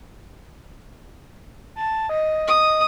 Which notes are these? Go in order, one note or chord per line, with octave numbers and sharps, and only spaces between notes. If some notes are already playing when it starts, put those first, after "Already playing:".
A5
D#5
D#6